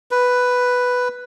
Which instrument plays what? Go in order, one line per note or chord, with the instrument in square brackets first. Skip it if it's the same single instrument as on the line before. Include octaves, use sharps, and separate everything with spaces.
[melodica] B4